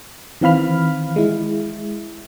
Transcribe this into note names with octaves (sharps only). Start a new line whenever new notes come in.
D#3 E3 C4 F5 B5 F6
G#3 E4